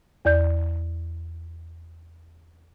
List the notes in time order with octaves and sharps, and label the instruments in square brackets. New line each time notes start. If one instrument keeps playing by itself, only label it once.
[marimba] E2 D5 G6